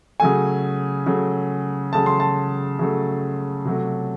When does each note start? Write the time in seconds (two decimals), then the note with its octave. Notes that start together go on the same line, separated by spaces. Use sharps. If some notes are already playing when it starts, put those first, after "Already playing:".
0.20 C#3 F#3 A3 G#5
1.06 C#3 F#3 A3
1.93 C#3 F#3 A3 A5
2.06 C6
2.20 A5
2.79 C#3 F#3 A3
3.65 C3 F#3 A3